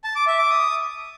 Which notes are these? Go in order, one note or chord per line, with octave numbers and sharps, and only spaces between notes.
A5
D6
E5
D6
D#6